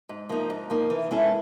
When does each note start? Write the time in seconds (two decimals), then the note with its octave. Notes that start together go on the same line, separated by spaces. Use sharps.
0.09 G#2
0.29 F3 A#3 D#4
0.50 G#2
0.70 F3 A#3 D#4
0.90 E3
1.11 G#3 C#4 E4 A4